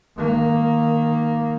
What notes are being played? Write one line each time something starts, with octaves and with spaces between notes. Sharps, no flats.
D#3 A#3